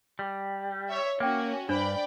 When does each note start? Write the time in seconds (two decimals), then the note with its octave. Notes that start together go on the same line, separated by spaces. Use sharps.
0.19 G3
0.89 C#5 E5
1.20 A#3 C#4 F#4 E5 G5
1.69 G2 D4 C5 D5 G5 B5